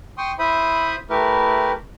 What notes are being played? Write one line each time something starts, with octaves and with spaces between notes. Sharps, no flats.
G5 C6 C#6 D#6
E4 C5 E5 B5 D#6
A3 E4 G4 A#4 B4